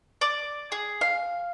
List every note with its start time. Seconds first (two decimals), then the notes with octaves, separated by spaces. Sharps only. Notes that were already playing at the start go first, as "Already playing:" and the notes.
0.21 D5
0.72 G#4
1.01 F5